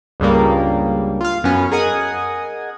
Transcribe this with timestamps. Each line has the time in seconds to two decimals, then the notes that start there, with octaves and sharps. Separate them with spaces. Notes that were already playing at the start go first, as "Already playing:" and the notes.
0.20 C#2 G2 C#3 G3 A#3
1.21 F4 F5
1.44 F#2 B3 C#4
1.71 G#4 A#4 D#5 F#5 G#5 D#6